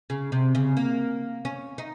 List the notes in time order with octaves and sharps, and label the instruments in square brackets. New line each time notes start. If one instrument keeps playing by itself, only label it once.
[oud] C#3
C3
C#3
A#3
C#4
D#4